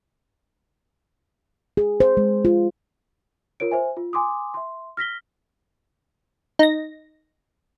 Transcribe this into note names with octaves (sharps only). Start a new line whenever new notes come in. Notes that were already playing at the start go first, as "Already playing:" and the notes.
G#4
C5
G#3
F4
F4 A#4 C#5 D7
C5 E5 G#5
F4
G#5 C6 D6 D#6
E5 C6
F6 A#6 B6 G7
D#4 A#6